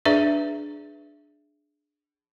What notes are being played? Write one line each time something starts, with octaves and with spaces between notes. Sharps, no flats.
D4 G#4 B4 D5 E5